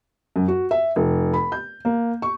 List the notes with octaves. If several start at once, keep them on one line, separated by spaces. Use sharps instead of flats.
F#2
F#4
E5
F1
B5
G6
A#3
C#6